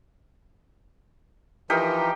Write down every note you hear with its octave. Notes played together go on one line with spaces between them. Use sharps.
E3 F3 D#4 G4 A#4